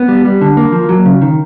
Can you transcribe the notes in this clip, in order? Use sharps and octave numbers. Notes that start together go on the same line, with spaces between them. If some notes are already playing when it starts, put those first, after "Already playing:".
Already playing: B3
G3
G3
D3
A#3
F3
F#3
C#3
D#3